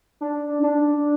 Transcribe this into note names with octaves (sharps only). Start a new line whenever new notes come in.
D4
D4